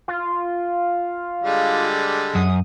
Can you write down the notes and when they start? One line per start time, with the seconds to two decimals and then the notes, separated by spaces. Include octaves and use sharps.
0.08 F4
1.44 D3 G3 G#3
2.35 F#2 D#6